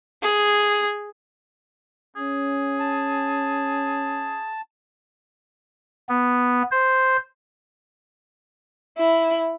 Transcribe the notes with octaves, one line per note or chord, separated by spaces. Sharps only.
G#4
C#4 G#4
A5
B3
C5
E4